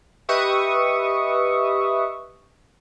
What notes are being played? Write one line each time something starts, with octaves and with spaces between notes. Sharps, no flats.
G4 B4 D#5 E5 C#6 D#6